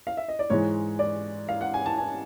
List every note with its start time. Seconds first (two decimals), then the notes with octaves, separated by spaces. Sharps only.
0.07 F5
0.17 E5
0.28 D#5
0.39 D5
0.50 G#2 E3 G#3 C#5
0.99 D5
1.49 F5
1.61 F#5
1.74 G#5
1.86 A5
1.98 G#5